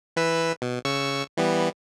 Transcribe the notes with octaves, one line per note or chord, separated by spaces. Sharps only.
E3 B4 E6
B2
C#3 C#6 E6
E3 G3 B3